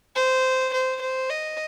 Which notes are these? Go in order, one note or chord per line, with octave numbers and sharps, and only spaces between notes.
C5
C5
C5
D#5